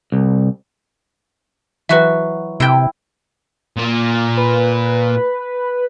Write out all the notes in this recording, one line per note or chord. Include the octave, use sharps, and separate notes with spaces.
C2
E3 F#3 F#4 B4 E5
C3 E4 G5
A#2 A#3
B4